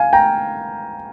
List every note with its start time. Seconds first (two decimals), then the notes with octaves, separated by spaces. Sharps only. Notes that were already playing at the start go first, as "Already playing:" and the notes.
Already playing: F5 G#5
0.13 G5 A#5